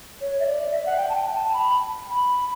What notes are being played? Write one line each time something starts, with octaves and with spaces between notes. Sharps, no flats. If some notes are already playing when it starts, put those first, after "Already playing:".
C#5
E5
D5
E5
F#5
G5
A5
G5
A5
B5
B5